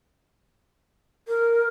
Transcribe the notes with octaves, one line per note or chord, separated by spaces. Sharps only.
A#4